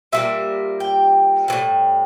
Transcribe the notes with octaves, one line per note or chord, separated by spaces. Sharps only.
A#2 G3 A#3 E5
G5
A2 E3 G3